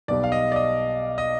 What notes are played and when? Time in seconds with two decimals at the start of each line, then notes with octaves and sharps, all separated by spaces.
0.08 B1 B2 G3 D5
0.24 F5
0.32 D#5
0.52 D5
0.56 D#5
1.18 D#5